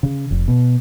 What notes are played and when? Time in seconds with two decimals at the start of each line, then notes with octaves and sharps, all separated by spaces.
0.03 C#3
0.31 F1
0.48 B2